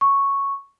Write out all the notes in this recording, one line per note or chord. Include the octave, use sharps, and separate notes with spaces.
C#6